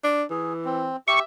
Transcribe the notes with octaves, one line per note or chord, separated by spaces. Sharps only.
D4
E3 G#4
C4
G4 E5 C#6